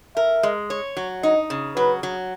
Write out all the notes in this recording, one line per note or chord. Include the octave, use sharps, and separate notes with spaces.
A#4 E5
G#3
C#5
F#3
D#4 D#5
C#3
F#3 B4
F#3